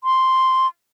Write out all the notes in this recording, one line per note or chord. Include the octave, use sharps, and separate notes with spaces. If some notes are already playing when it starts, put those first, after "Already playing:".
C6